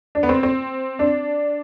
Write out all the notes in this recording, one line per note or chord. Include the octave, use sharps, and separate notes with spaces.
D4
B3
C4
C4
D4